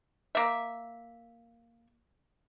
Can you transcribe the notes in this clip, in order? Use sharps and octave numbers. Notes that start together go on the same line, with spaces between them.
A#3 E5